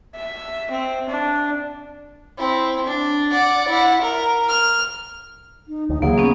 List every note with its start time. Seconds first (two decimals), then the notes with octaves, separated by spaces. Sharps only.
0.16 E5
0.71 C4
1.09 D4
2.37 C4 E4
2.85 D4
3.31 D5 F#5
3.68 E4 F#5
4.01 A#4
4.48 F6
5.68 D#4
5.89 D2 D#4
6.02 C#3 E3 F#3 A#3 G#4
6.18 B3 C#4